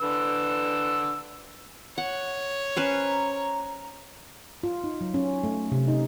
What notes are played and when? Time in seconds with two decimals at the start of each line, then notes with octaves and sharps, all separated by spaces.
0.01 D3 B4 E6
1.98 C#5 F#5
2.77 C#4 B4 C5 A#5
4.63 F4
4.84 D#4
5.01 F#3
5.14 C#4
5.44 A3
5.72 C3
5.88 D#4